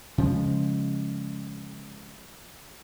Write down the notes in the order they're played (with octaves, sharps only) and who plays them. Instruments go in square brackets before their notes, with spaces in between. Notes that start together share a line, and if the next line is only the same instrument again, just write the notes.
[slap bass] C#3 F3 G#3